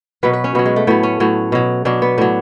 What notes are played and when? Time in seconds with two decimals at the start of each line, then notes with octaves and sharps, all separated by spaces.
0.23 B2 F#3 B4
0.33 B4
0.44 C#4
0.55 B2 F#3 B3
0.65 G#3
0.76 A3
0.87 A2 F#3 B3
1.03 C#4
1.20 A2 F#3
1.52 B2 F#3
1.85 B2 F#3 D4
2.02 B3
2.18 A2 F#3 D4